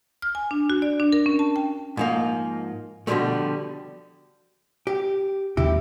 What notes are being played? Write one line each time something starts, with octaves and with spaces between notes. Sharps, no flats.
F6
G#5
D4
F#4
D5
D4
A#4
C#4
A5
G5
G#2 F3 A#3
B2 D3 D#3 F3 G3 A3
G4
D#2 C3 D#3 E4 G4